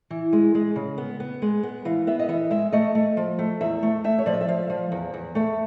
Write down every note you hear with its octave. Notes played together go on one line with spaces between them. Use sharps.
E3
G#3
G#3
C#3
B3
B3
G#3
B3
E3 F5
B3 E5
D#5
E3 E5
G#3 E5
A3 D#5
A3
F3
A3
E2 E5
A3
A3 E5
C#5
F3 D5
D#5
E5
F3 F5
F3
E2
E2
A3 E5